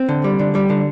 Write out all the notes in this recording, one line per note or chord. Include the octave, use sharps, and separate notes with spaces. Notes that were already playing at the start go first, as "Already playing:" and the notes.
Already playing: C4
D3
G3
D3
G3
D3